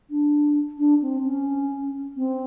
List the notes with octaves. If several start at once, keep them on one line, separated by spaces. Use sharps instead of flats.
D4
D4
C4
C#4
C4